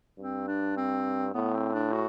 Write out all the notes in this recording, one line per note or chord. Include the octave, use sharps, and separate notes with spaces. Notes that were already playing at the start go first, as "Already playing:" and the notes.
G2 C4
D4
C4
A2 B3
C4
D4
F#4